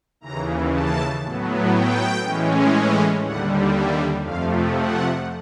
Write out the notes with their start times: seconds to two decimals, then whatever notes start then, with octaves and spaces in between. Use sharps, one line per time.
0.20 D#2 C#3 E3 A#5
0.72 A5
1.22 A2 F#3 B3
1.72 G5
2.22 A2 E3 G#3 C#4
3.22 D#2 D3 G3 F#5
3.73 E5
4.22 F2 C3 F3 A3 F5
4.73 F#5